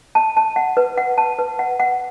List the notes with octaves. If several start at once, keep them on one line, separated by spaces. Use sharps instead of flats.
A5
A5
F#5
B4
F#5
A5
B4
F#5
F#5